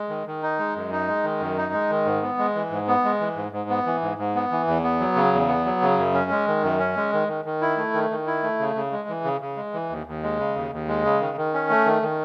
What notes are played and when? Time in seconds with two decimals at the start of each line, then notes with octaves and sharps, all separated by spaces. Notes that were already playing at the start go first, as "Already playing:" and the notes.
Already playing: G#3
0.09 D#3
0.27 D#3
0.42 D#4
0.59 G#3
0.76 F#2
0.92 D#4
1.08 G#3
1.24 D#3
1.40 F#2
1.57 D#4
1.73 G#3
1.90 D#3
2.06 G#2
2.23 B3
2.39 G#3
2.55 E3
2.71 G#2
2.87 B3
3.04 G#3
3.20 E3
3.36 G#2
3.52 G#2
3.69 B3
3.86 E3
4.02 G#2
4.18 G#2
4.35 B3
4.51 E3
4.67 E2
4.84 B3
5.00 F#3
5.16 C#3
5.33 E2
5.48 B3
5.65 F#3
5.82 C#3
5.98 F#2
6.14 C#4
6.31 G#3
6.48 D#3
6.63 F#2
6.79 C#4
6.97 G#3
7.13 D#3
7.28 D#3
7.45 D#3
7.61 E4
7.77 A3
7.94 D#3
8.10 D#3
8.27 E4
8.43 A3
8.59 C#3
8.75 C#3
8.92 G#3
9.09 E3
9.24 C#3
9.41 C#3
9.57 G#3
9.74 E3
9.90 D#2
10.07 D#2
10.23 G#3
10.39 C#3
10.55 D#2
10.72 D#2
10.88 G#3
11.04 C#3
11.20 D#3
11.37 D#3
11.54 C#4
11.70 A3
11.85 D#3
12.02 D#3